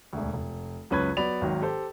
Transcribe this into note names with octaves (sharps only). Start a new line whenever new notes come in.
E1 D2
F1
C#2 F#2 C#4 B4 B5 G#6
F#3 B3 D5 B5 F7
G#1 D#3 F#3
G4 A4 C5